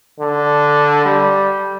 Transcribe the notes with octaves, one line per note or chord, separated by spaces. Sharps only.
D3
G3